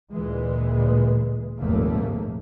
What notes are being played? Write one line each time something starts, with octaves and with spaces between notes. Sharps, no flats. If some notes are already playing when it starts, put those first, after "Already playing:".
D2 A#2 E3 G#3
F1 A#1 D#2 G#2 A3 A#3